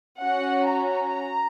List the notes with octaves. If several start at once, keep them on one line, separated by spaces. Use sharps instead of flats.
C#4 F#4 F#5
A#5